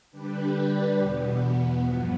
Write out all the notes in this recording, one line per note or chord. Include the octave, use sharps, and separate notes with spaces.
D3 G3 D4 G4 B4
E2 B2 B3
G2 F3 B3